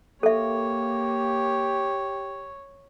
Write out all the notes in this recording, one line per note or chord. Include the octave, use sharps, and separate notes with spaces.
A#3 G4 A4 C#5 E5